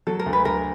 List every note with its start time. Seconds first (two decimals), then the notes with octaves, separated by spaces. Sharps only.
0.07 F#3 A4
0.19 A#4
0.26 D2
0.33 B4
0.45 D2 A#4